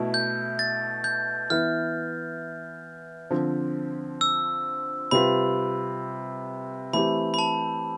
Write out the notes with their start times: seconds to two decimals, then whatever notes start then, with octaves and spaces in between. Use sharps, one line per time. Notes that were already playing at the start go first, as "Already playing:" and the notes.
Already playing: B2 A3 E4
0.14 G6
0.59 A6
1.04 G6
1.50 E3 B3 E4 B4 F6
3.31 D3 F3 C4
4.21 E6
5.11 C3 G3 C4 F4 B4 B5
6.93 E3 A3 C4 G4 B5
7.34 B5
7.39 A5